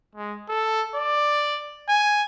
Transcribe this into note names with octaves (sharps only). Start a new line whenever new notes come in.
G#3
A4
D5
G#5